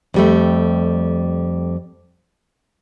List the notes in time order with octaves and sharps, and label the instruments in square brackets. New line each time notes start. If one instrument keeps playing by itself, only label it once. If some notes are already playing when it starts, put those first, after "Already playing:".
[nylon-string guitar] F2 G3 A3